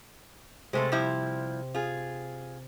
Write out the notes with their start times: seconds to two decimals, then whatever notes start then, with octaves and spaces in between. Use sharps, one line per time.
0.73 C3 G#3 A3 A4
0.92 F3 G3 E4
1.74 F4 G#4